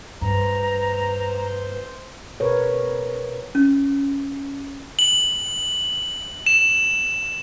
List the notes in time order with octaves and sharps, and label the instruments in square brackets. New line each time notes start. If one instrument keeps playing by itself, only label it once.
[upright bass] G2 [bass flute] B4 [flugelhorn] C5 [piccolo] A#5
[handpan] B2 A#4 B4 C#5
[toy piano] C#4
[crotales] F#7
E7